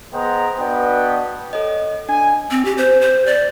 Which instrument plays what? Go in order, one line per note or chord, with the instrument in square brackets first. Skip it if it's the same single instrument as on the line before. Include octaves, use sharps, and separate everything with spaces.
[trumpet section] B3 G#4 C5 D#5 G5 A#5
B3 D4 F#4 B4 D#5 G5
[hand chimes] A4 C#5 D#5
[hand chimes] D4 [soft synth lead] G#5
[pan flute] C4
G4
C5
C5
D5